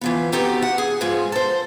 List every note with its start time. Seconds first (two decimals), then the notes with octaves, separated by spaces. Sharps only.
0.01 E3 F3 B3
0.32 B3 C4 D#4 F#4 G4 A4
0.62 F#5
0.78 G#4
1.01 G#2 F3 G#3
1.32 A4 C5